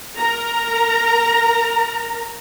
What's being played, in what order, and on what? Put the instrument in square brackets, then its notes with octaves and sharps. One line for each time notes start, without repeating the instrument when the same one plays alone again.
[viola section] A#4 A#5